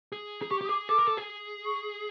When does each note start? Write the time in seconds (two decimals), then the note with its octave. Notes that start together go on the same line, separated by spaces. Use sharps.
0.12 G#4
0.42 G#4
0.51 G4 C#6
0.61 G4
0.65 D#6
0.69 G#4 D6
0.89 A4 D6
0.99 A#4
1.07 A4
1.17 G#4
1.66 C#6